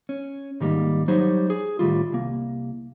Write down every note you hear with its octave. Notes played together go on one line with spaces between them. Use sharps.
C#4
G#2 D#3 G3 A3 A#3
F#3 G3 D#4 C5 C#5
G#4
A2 D#3 G3 F4
C2 A#3